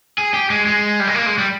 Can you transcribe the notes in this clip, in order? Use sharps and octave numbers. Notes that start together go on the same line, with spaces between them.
G#4
G4
G#3
G#3
G3
G#3
A#3
G#3
G3